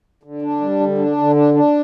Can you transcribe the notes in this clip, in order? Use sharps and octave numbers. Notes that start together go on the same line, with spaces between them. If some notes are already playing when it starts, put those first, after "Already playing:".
D3
D4
G3
D3
D4
D3
D4
D4